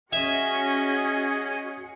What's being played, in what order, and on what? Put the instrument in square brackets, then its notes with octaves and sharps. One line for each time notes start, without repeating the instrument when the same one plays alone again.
[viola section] C#4 D#5 [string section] F#4 G#4 C#7 [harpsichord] E5 [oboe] G#5